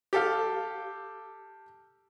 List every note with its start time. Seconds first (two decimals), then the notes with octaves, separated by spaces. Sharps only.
0.13 G4 A4 F5